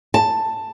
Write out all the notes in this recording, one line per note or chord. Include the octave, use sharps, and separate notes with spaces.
A5